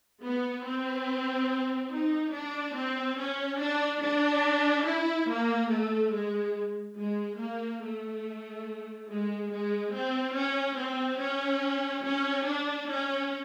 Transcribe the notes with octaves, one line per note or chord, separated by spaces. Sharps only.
B3
C4
D#4
D4
C4
C#4
D4
D4
E4
A#3
A3
G#3
G#3
A#3
A3
G#3
G#3
C4
C#4
C4
C#4
C#4
D4
C#4